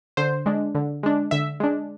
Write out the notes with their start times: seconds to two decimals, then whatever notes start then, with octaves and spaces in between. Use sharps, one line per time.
0.17 D3 C5
0.46 G#3 D4
0.75 D3
1.03 G#3 D4
1.31 D3 E5
1.60 G#3 D4